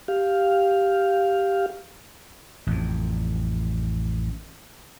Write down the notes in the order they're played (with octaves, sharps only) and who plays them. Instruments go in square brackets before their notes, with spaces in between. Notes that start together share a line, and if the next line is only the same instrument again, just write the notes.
[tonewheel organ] G4 F5
[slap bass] A1 F2